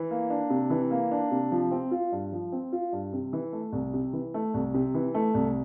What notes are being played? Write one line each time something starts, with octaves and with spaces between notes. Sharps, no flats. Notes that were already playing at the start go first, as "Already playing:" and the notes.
Already playing: E3
A#3
D4
C3
E3
A#3
D4
C3
F3
C4
F4
G2
F3
C4
F4
G2
C3
E3
A3
C2
C3
E3
A3
C2
C3
E3
A3
C2